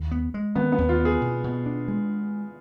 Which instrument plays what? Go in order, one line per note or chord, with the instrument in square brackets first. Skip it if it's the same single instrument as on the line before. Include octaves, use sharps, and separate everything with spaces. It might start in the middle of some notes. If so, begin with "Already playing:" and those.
Already playing: [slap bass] D#2
B3
G#3
[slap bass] D#3 [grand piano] B3
[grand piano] B3
[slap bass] D#2
[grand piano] F4
[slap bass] B3
[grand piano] G#4
[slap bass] B2
B2
D4
G#3